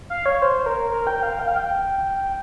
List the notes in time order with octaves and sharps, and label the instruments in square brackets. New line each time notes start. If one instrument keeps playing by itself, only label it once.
[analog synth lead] F5
C#5
C5
A#4
A#4
G5
F5
G5
F5
G5